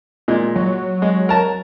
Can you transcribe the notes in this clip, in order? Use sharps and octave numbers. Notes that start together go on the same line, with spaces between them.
A#2 G#3
F#3
G#3
A#4 A5 A#5